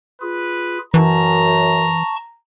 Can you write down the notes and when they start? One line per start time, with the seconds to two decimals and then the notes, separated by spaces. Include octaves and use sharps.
0.21 F4 G#4 B4
0.94 F#2 E3 A5 A#5 C#6